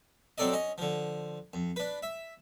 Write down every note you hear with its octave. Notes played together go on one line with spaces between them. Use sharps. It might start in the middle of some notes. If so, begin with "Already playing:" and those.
F#3 C4 D4 A4 D5 D#5
C#4 D#5
D3 F3
F2
D4 B4
E5